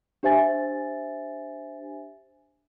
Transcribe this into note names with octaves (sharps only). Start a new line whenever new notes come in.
D4 G4 C5 E5 G#5 A6